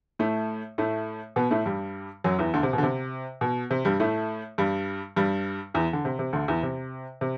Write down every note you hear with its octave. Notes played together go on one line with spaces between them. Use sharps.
A2 A3
A2 A3
B2 B3
A2 A3
G2 G3
F#2 F#3
E2 E3
D2 D3
C3
B2
D3
C3
B2
C3
G2 G3
A2 A3
G2 G3
G2 G3
E2 E3
D3
C3
C3
D2 D3
E2 E3
C3
C3